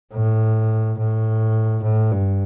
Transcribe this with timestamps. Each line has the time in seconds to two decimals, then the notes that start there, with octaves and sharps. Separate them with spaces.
0.13 A2
0.99 A2
1.83 A2
2.11 G2